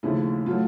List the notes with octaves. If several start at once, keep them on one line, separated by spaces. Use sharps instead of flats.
D#2 C#3 F3 A3 E4
A2 F#3 A3 F4